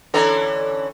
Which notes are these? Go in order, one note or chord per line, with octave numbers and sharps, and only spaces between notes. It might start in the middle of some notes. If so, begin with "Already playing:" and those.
D3 E3 C#4 A4 A#5